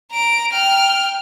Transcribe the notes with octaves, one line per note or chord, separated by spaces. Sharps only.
A#5 D7
G5 F6